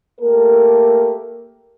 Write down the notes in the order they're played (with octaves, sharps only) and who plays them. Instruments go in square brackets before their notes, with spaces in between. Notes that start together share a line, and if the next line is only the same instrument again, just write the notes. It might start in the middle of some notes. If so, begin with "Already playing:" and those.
[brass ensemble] A3 A#3 G4 A4 A#4